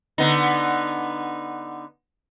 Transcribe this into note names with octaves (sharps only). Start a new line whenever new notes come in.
D3 B3 D#4